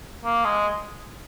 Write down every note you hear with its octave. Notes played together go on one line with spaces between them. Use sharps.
A#3
G#3